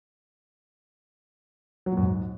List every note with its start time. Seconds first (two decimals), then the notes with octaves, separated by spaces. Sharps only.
1.86 F#3
1.92 A#2
1.97 F#2
2.03 G#2